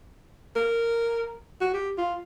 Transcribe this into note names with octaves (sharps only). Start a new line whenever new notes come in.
A#4
F#4
G4
F4